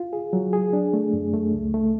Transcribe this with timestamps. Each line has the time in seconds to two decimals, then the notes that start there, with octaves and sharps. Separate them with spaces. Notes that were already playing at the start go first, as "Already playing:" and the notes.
Already playing: F4
0.13 G#4
0.33 F#3
0.53 G#4
0.73 D4
0.93 A3
1.13 F#2
1.33 A3
1.53 C#2
1.74 A3